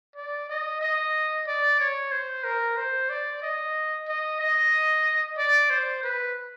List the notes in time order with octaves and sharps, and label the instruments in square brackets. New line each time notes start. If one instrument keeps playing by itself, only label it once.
[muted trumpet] D5
D#5
D#5
D5
C#5
C5
A#4
C5
D5
D#5
D#5
D#5
D5
C5
B4